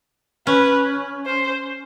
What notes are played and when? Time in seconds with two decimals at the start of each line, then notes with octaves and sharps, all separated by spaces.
0.47 C#4 B4
1.26 C5